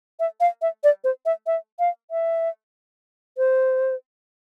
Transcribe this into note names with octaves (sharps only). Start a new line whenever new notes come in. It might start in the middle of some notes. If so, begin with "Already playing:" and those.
E5
F5
E5
D5
C5
E5
E5
F5
E5
C5